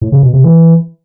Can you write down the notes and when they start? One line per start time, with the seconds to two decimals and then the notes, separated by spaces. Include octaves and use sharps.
0.02 A2
0.12 C#3
0.23 B2
0.33 C3
0.44 E3